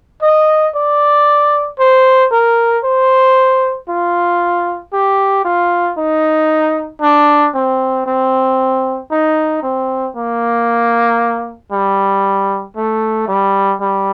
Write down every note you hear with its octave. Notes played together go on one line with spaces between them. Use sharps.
D#5
D5
C5
A#4
C5
F4
G4
F4
D#4
D4
C4
C4
D#4
C4
A#3
G3
A3
G3
G3